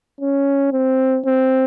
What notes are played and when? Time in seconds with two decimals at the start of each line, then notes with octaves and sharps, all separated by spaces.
0.21 C#4
0.73 C4
1.26 C4